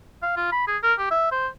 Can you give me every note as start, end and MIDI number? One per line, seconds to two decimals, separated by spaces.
0.23 0.33 77
0.37 0.51 65
0.52 0.64 83
0.67 0.77 68
0.83 0.94 70
0.99 1.07 67
1.11 1.31 76
1.32 1.47 72